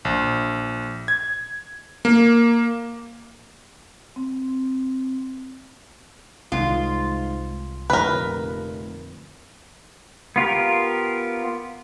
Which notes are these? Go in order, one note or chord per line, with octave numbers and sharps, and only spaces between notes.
A#1
G#6
A#3
C4
C2 G#2 D#3 F4
F1 F2 A#2 D3 A#4 B4
B3 F4 G4 A#4